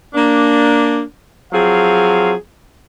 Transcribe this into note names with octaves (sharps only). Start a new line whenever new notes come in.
A#3 D4
F3 F#3 C4 G#4 F5